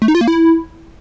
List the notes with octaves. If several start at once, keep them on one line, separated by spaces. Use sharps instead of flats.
A3
D#4
F4
A#3
E4